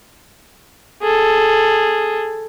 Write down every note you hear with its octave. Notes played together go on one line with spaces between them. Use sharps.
G#4 A4